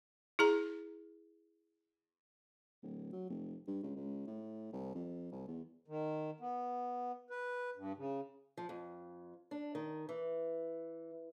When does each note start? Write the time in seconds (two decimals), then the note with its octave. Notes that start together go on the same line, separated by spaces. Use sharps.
0.39 E4 G#4 A#5
2.83 D1
3.13 F#3
3.30 F1
3.68 G2
3.83 C#2
3.96 C#2
4.27 A2
4.73 C2
4.95 F2
5.32 C2
5.48 E2
5.88 D#3
6.40 B3
7.30 B4
7.76 G2
7.97 C#3
8.57 F3
8.69 F2
9.51 D4
9.75 D#3
10.09 E3